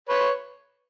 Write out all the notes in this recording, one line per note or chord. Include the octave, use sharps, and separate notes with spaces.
B4 C#5